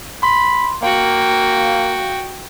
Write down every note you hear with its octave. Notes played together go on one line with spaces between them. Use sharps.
B5 C6
A#3 F#4 F5 G5